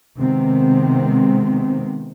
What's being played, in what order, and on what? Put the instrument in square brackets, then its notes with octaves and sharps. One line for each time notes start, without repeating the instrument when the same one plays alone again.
[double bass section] C3 D#3 G#3 B3 C4